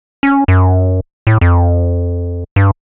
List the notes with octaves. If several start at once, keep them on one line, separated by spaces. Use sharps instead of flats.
C#4
F#2
A2
F2
G2